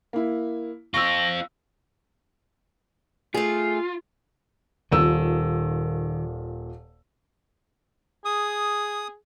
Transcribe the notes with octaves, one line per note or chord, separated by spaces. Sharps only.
A#3 E4
C4 F4 C#6 E6 A#6
A3 F4 G#4
D#1 A#2 D#3 E6
G#4 D#6